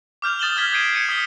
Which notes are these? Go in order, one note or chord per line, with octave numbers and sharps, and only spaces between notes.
D6 F6 G6 F7
D#6 A6 E7 F#7 G7
F6 G#6 B6 G7
G6 G#6 C7 D7 D#7
G#6 C#7 D#7
D#6 B6 G7